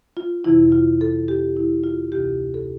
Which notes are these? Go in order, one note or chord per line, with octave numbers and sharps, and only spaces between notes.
F4
F2 C3 E3 E4
F4
A4
G4
E4
F4
D2 C3 E3 G4
A4